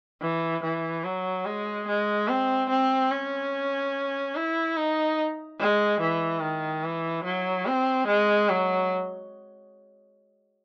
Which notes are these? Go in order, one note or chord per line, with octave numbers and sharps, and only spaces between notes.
E3
E3
F#3
G#3
G#3
C4
C4
C#4
E4
D#4
G#3
E3
D#3
E3
F#3
C4
G#3
F#3